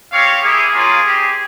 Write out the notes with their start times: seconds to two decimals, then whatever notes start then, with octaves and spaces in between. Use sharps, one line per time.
0.12 C4 G4 C#5 F5
0.43 A#3 E4 G4 G#4
0.74 A#3 C#4 F4
1.05 C4 G4